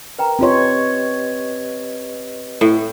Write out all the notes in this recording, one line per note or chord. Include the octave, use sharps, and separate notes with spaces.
A#4 B4 G5 A#5
C4 D4 F4 G4 B4 C#5 D#5 C6
A2